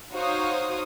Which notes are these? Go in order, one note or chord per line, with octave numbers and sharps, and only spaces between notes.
D#4 F#4 C5 C#5 F5 D#6